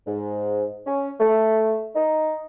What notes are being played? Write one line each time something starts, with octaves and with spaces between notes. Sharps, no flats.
G#2
C#4
A3
D#4